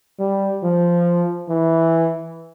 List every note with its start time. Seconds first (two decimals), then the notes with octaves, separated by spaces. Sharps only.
0.20 G3
0.63 F3
1.49 E3